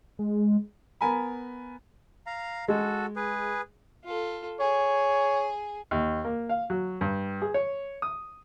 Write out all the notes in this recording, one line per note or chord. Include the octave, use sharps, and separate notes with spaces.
G#3
B3 A#4 G#5 A#5 B5
F5 A#5
G#3 F#4 A4
G#4 B4
F4 A4
G#4 C#5
D#2
A#3
F5
F#3
G2
G#4
C#5
D#6